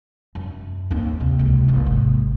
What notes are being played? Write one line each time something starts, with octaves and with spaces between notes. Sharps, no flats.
F#2
D#2 C4
C3
C#2 E4
F#1 C3
G#1